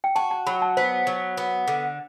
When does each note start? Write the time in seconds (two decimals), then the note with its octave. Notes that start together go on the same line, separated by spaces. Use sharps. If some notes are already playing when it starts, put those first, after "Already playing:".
0.04 G5
0.16 F#4 A5
0.31 A5
0.47 F#3 B5
0.62 A5
0.77 B3 C5
1.07 F#3
1.37 B3
1.68 D3